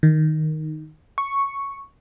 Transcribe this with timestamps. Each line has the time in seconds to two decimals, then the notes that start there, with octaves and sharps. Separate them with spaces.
0.03 D#3
1.18 C#6